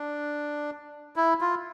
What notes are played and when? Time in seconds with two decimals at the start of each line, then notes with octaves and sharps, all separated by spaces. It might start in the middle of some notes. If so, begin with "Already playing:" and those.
Already playing: D4
1.16 E4
1.41 F4